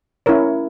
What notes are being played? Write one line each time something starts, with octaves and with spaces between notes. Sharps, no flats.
C#4 E4 A#4 C#5